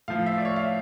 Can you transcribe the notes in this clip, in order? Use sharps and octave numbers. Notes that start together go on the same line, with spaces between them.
A2 F3 F5
E5
D5
C#5
F5
E5